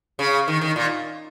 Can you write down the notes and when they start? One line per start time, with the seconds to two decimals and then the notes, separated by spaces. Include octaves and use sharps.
0.19 C#3
0.48 D#3
0.61 D#3
0.76 A#2